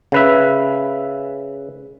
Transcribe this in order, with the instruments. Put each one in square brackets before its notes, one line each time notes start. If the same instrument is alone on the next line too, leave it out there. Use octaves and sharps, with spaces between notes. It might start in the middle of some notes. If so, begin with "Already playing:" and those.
[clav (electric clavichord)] C#3 B4 E5